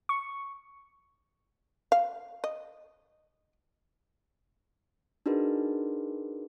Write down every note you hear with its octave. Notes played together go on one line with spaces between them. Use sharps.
C#6
F5
D#5
D4 D#4 F#4 G#4 A#4 B4